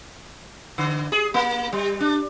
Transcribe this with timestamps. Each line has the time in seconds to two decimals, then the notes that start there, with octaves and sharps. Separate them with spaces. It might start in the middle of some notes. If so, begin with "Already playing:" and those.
0.78 D3
1.12 G#4
1.34 A#3
1.73 G3
2.00 D4